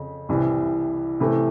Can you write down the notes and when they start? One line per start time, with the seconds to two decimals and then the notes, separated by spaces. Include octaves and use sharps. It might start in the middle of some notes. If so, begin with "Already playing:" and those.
Already playing: F2 C#3
0.29 C2 C3 E3
1.20 C3 E3 A3